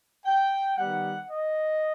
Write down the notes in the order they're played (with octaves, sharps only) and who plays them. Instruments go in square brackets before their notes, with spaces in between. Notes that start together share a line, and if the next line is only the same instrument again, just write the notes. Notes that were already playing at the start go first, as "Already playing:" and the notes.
[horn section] G5
D#3 G3 B3 F#5
D#5